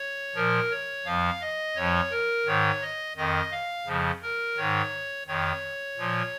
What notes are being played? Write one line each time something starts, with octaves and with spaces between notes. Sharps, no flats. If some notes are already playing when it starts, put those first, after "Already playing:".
Already playing: C#5
A#2 F3 A#4
C#5
F2 F3 F5
D#5
F2 F3 C#5
A#4
G#2 D#3 C#5
D#5
F2 D#3 D#5
F5
F2 C#3 F3
A#4
G#2 D#3 C#5
F2 D#3 C#5
A#2 F3